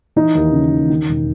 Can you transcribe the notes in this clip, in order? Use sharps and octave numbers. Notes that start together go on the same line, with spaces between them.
E3 D#4
D#2
C#3
D#2
D#3
E1